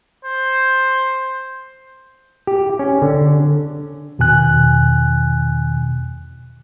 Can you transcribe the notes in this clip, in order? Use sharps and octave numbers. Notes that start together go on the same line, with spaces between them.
C5
G4
C#4
D3
E2 B2 D#3 G#5 F#6